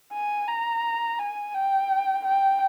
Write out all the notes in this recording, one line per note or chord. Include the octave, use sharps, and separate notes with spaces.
G#5
A#5
G#5
G5
G5